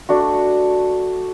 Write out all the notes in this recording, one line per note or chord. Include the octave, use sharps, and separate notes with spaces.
A3 D4 F#4